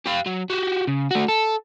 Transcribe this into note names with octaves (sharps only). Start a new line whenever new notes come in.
G4 F5
F#3
F#4 G4
C#3
A3 F#4
A4